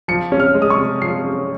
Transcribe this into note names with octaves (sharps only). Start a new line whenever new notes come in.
F3 C#7
C#4
F6
G#3
D#6
C#6
C3
F3 C7
C#4